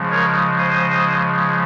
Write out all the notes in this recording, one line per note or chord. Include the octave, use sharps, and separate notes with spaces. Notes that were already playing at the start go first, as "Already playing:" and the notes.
Already playing: C#3 F3 G#3
A#4 C#5
C5 D#5